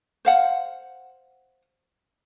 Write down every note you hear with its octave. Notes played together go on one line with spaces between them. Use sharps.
C5 F5 F#5